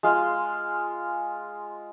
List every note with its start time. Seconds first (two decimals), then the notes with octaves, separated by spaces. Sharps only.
0.03 G#3 F4 F5